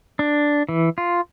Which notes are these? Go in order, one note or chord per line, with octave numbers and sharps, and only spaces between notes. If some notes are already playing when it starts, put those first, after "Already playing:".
D4
E3
F4